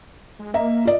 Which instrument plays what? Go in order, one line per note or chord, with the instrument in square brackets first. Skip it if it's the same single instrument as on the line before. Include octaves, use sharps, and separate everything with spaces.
[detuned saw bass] G#3
[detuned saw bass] A#3 [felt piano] D#5 E5 A#5
[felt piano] F4 D5 D#5